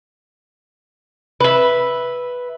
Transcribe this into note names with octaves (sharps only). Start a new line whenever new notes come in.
B4 E5